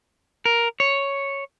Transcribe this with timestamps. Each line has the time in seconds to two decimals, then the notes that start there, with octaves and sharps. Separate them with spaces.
0.45 A#4
0.80 C#5